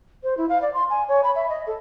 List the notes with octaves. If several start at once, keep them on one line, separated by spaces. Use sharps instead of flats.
C5
E4
F5
D5
C6
G#5
C#5
B5
E5
D#5
A4